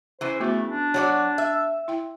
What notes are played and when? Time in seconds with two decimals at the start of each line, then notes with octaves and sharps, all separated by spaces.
0.21 C#3 E3 C5
0.40 A3 B3 F#4
0.69 D4
0.94 F#3 F#4 C#5 D5
1.38 E5
1.88 E4 G5